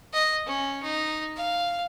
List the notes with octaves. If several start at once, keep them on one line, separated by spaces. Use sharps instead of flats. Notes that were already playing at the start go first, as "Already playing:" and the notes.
D#5
C#4
D#4
F5